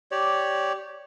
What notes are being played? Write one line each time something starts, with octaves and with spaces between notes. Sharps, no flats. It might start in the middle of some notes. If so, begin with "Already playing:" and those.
G4 C#5 D5